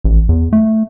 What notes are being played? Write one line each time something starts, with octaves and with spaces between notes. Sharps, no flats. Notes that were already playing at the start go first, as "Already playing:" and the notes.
A1
E2
A3